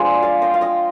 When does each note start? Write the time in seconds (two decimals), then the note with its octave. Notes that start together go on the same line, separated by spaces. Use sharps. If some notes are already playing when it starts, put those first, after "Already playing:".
Already playing: F3 G#3 D4 F4 G#4
0.22 D5 F5
0.42 D#5 G5
0.54 F5
0.61 D#5 G5